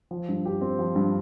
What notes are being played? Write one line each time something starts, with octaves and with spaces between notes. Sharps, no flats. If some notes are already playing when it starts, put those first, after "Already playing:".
F3
G2
G4
C4
F3
G2